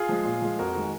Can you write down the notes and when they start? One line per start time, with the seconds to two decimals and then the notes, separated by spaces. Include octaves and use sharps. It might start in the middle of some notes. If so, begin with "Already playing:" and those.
Already playing: F4 G#4
0.09 F3 G#3
0.25 A#2
0.42 F3 G#3
0.59 F2 F#4 A#4
0.76 D#3 G#3